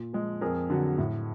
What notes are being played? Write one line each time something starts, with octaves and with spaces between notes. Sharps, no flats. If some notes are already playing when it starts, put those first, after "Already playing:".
Already playing: A#2
F3 G#3
F2 G#4 A#4
D3 F#3
A2